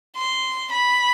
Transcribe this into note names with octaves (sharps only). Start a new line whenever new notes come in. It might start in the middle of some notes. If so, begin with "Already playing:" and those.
C6
B5